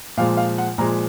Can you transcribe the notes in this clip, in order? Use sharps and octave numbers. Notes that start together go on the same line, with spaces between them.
A#2 F3 G#3 F5
F5
F#5
A#2 F3 G#3 A#5